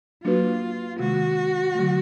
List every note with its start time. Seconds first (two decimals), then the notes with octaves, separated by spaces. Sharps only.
0.24 F#3 A#3 D4 F4 F#4 B4
1.00 C3 D#3 G#3 F#4
1.75 D3 F#3 A3